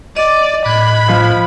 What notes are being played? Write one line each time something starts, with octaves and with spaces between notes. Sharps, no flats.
D5 D#5
A2 B5 F#6 G#6
F3